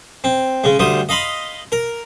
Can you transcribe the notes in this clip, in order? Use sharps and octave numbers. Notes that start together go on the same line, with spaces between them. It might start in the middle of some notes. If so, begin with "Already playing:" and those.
C4
C#3 G#3
D2 G3 C5 D#6
D#5 F5 B5 C6
A#4